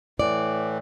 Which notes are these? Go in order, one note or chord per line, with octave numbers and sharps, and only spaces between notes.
A2 E3 D5